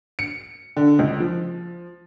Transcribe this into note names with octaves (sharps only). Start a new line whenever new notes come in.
C#7
D3
C#2
F3